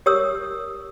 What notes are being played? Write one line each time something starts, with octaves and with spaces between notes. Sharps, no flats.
G4 A#4 C#5 D#6 E6